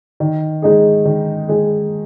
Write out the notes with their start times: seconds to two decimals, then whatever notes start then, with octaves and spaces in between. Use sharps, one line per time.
0.20 D#3
0.62 G#3 D#4 G#4
1.05 D#3
1.48 G#3 D#4 G#4